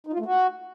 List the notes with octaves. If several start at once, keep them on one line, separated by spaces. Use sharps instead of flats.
D#4
F4
A3
F#4